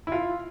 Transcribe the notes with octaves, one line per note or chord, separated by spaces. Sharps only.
E4
F4